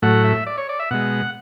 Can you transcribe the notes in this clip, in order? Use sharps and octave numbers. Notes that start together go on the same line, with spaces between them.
A2 F#3 A3 F#5
E5
D5
C#5
D5
E5
B2 G#3 F#5